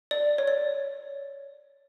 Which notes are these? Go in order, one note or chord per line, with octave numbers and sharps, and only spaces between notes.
D5
C#5
D5